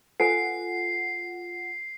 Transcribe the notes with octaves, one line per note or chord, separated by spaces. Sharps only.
F4 A4 B4 F#5 G#5 C7